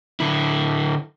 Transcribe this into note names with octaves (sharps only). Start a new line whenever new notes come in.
D3 E4